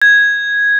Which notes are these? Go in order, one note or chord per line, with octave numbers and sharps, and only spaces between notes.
G#6